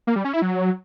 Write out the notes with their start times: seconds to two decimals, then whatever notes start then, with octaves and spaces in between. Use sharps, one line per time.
0.07 A#3
0.16 G3
0.25 C#4
0.33 E4
0.42 F#3